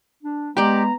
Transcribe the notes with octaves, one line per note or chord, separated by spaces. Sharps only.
D4
G#3 B3 G4 D5 A#5